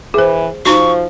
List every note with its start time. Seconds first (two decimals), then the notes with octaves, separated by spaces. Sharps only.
0.14 E3 G#4 C5
0.66 F3 D#4 F#4 C#6